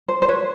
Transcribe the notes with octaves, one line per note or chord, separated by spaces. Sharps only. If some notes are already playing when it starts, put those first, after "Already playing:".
C5
C5
B4 C#5